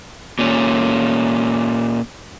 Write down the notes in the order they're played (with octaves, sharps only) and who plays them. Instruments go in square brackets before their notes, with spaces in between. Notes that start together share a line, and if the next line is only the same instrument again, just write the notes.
[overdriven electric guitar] A#2 C#4